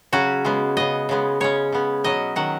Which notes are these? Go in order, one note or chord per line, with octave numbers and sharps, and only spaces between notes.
C#3 F#3 C#4 F#4
C#3 G#3 B3
C#3 B3 D#5
C#3 G#3 B3
C#3 G#3 C#4 C#5
C#3 B3
B2 F#3 C#4 D#5
D#3 F#3 C#4 F#5